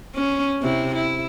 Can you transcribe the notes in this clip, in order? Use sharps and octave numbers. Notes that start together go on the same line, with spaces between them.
C#4
C3 E4
E4